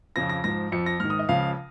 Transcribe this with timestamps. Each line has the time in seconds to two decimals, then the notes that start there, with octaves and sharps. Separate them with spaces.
0.16 F2 C#3 F3 A#6
0.29 A#6
0.44 G#2 F3 A#6
0.72 F2 F3 C#7
0.86 A#6
1.00 G#2 D#3 F6
1.10 D#6
1.19 D#5
1.29 C#2 C#3 F3 F5